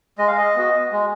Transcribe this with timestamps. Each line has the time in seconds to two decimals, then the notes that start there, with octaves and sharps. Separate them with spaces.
0.18 G#3 D#5
0.27 F5
0.38 D#5
0.56 B3 F#4
0.93 G#3